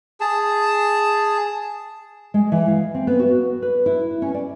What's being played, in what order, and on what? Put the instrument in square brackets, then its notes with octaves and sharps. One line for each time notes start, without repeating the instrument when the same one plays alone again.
[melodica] G#4 A5
[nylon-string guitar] G#3
E3
F5
C4
B3
F#4
B4
E4
C#4
D5